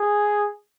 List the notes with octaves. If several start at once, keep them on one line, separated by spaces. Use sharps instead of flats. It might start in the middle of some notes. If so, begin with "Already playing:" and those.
Already playing: G#4